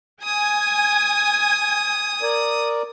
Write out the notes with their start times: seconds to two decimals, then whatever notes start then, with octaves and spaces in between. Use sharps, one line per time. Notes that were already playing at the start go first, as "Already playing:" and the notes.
0.22 G#5 D#6
2.22 A#4 D5